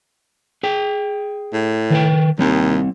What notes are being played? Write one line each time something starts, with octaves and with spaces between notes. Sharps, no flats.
G#4 G5
A2
D#3 B4 G5
D#2 G3 C4